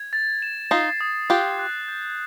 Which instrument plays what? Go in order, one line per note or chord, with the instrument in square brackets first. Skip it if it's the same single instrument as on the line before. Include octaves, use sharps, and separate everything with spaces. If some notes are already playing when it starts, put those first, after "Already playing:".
Already playing: [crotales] G#6
A6
E7
[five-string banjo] D#4 F4 [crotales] C7
[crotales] D#6
[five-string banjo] F4 G4 [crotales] F#6
[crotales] F#6
G6